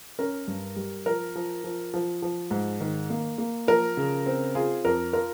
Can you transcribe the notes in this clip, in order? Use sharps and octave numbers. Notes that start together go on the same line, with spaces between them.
C#4 A#4
G2
G3
F3 A#4
F3
F3
F3
F3
G#2
D#3
A#3
A#3
F3 A#4
C#3
C4
F4 G#4
F2 A#4
F4 A#4